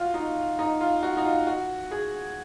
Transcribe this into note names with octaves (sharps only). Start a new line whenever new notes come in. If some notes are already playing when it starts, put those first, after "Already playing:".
Already playing: F4 F#4
D#4
D#4
F4
F#4
D#4
F4
F#4
G#4